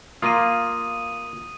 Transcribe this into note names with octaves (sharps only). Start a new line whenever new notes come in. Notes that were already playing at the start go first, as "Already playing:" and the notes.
A#3 F4 D#6 D#7